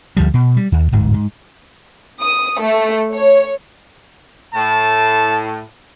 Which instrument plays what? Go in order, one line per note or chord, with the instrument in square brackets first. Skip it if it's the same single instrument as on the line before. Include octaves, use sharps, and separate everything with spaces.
[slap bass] D2 F3 G3
B2
G3
D#2
D1 G1 G#2
G#2
[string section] D#6
A3
C#5
[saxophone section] A2 [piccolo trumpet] A5